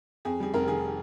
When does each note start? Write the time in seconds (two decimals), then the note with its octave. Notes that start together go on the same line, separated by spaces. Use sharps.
0.25 F2 G#4
0.40 G3 G#4
0.54 F1 A#4
0.68 D#3 G#4